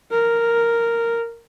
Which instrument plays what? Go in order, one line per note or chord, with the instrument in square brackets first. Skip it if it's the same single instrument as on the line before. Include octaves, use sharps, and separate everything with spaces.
[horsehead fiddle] A#4